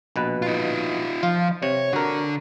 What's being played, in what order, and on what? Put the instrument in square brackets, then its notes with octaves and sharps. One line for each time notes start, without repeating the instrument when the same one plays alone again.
[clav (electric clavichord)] A#1 B2 B4
[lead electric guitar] D#4 F4
[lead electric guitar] F3 [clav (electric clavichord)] F4
[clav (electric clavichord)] C3 [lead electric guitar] C#5
[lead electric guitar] D3 D4 [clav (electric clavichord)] F#4 A#4